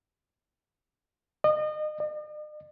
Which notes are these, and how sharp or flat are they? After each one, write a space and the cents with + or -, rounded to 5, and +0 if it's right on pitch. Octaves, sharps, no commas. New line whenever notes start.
D#5 -30
D#5 -45